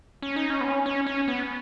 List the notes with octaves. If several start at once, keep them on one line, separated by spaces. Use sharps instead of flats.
C#4
D#4
C#4
B3
C#4
C#4
C#4
B3